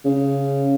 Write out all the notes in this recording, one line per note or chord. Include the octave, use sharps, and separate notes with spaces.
C#3